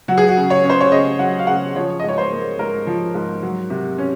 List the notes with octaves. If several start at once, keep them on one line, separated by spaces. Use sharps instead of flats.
F#3 F#4
G#4
F#4
C#3
C#5
C#4
C5
C#5
C#3 D#5
F#3 F#5
F5
C#3 F#5
F3 C#5
D#5
G#2 C#5
C5
A#3
G#2 A#4
F3
G#2
F#3
C3
C#4